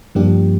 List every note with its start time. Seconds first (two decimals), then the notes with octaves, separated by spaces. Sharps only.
0.15 G2 F3 A#3 D4 G4